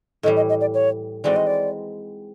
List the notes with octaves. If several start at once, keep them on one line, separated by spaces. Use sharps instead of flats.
A2 E3 G3 D#5
D#5
D#5
D5
C#5
E3 G#3 C4 D#4 F#4 D5
D#5
D5